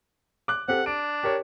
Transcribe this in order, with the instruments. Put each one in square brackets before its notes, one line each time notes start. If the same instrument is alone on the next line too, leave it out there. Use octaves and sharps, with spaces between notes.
[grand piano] D6 F#6
[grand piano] C4 G4 A4 [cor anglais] F#5
[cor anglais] D4 [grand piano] D7
[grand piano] G4 A#4 C#5